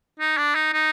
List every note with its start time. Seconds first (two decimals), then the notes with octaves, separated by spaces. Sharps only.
0.20 D#4
0.38 D4
0.55 D#4
0.73 D#4